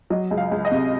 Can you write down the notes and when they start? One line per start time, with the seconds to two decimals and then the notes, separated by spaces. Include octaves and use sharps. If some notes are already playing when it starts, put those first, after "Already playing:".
0.10 F#3 D#5
0.31 C#2
0.37 F5
0.51 C#2
0.65 D#5
0.71 C3